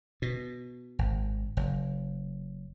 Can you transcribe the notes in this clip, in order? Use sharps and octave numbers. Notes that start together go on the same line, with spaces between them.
B2
G#1
F#1